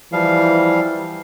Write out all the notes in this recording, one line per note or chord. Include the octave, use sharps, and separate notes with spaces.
E3 F3 G3 F5